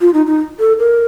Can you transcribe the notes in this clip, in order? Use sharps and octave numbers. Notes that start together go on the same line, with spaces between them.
F4
D#4
D#4
A4
A#4